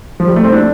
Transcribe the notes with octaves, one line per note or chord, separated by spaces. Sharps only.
F3
G3
A3
C4
D4